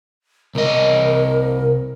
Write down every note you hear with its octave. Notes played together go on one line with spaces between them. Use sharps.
C2 A#4 D#5